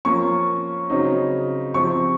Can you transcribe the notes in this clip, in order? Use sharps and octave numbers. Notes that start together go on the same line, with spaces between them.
F3 A#3 C#4 F4 C#6
C#3 F#3 C4 D#4
C3 F3 C4 C#6